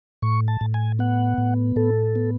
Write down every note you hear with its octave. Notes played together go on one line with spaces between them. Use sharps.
A2 C#6
A5
A2
G#5
B3 F#5
A2
A2 A4
B3